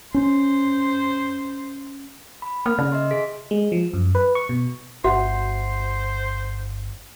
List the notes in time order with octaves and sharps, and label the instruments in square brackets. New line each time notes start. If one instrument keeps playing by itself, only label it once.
[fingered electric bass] C#4 [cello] C5
[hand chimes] B5
[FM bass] A#3 [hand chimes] F6
[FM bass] C#3
[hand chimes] D#5 E5 C6
G#4 B6
[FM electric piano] G#3
F3
F#2
B4
C#6
B2
[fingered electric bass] G1 [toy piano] F#4 [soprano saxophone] C5 [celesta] E5 F#5 C6